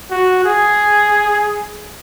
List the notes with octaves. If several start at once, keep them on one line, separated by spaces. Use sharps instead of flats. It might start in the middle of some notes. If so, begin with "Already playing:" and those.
F#4
G#4